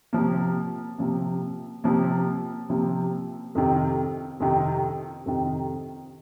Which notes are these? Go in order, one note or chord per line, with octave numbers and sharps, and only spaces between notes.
C3 F3 A#3
C3 F3 A#3
C3 F3 A#3
C3 F3 A#3
F2 C3 D#3
F2 C3 D#3
F2 C3 D#3